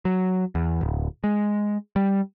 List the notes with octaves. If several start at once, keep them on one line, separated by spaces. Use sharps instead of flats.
F#3
E2
D1
G#3
G3